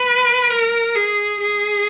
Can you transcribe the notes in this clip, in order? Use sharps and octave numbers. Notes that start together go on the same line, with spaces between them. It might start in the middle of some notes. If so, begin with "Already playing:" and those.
Already playing: B4
A#4
G#4
G#4